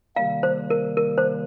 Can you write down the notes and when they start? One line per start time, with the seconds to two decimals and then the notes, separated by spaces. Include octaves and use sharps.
0.16 C3 D#3 G3 A#3 F5
0.43 C5
0.70 A#4
0.97 A#4
1.18 C5